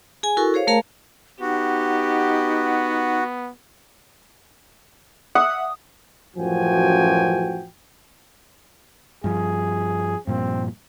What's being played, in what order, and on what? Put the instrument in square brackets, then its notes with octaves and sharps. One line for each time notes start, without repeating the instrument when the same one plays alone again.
[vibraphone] G#4 G#5
E4 F#4 A4 A#4 C#6
G#4 C5 C#5 F5
A3 G#4 A#4 F5 A5 A#5
[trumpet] B3 [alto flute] D#4 [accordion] F#4 [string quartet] G4
[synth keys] E5 F#5 [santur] D#6
[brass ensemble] A1 F#2 F3 F#4 G5 G#5
[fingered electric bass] G2 F3 [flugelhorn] G#4
[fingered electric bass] G2 A#2 F3 [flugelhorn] C4